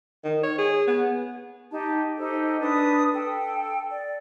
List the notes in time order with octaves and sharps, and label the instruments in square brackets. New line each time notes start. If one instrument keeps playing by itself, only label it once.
[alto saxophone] D#3
C#5
G#4
B3
[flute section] D#4 G4 A5
D#4 G4 A4 C5
D4 B4 D#6
A4 G5
D5